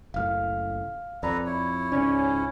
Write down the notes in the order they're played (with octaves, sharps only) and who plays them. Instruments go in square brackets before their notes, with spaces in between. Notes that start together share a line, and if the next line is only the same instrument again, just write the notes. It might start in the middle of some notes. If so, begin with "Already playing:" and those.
[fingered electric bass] F#1 A2 [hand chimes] F5 F6
[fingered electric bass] F2 [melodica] A4 B4 A#5 [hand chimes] D5 B5
[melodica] E4 C#5
[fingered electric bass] C#2 G#2 [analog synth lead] C#4 [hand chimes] D5